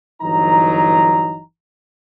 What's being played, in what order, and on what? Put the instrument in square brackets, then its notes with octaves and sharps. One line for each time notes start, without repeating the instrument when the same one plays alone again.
[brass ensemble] G1 E3 F#3 D#4 A#5